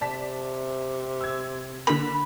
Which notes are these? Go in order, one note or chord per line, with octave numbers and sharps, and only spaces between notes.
C3 D5 A5 B6
E6 G#6
D3 A#3 B5